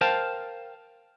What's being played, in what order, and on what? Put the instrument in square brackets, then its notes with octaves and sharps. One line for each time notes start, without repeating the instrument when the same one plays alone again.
[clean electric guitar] A#4 C5 F5 G5 A5